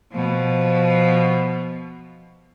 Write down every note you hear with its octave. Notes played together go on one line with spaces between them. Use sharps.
B2 F3